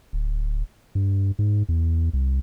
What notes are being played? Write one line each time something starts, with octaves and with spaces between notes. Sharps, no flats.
D1
G2
G#2
E2
C2